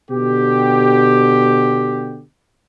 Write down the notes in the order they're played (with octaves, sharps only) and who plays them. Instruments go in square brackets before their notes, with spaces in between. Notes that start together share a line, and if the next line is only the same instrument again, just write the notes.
[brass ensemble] B2 D3 G4